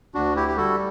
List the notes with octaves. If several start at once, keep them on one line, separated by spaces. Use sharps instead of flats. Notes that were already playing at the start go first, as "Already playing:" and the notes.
D2 D4 F#4
E4 G4
G4
G3 F#4 A4